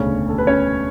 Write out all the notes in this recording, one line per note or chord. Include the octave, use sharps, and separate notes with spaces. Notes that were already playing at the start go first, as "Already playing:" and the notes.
Already playing: E1 D2 C#3 C#4 C#5
A4
B4
C#4 C#5